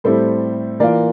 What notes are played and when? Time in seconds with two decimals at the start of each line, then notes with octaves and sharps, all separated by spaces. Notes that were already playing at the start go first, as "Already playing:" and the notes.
0.04 A2 G3 C4 E4 A4 C5
0.80 E3 A#3 F4 A#4 D5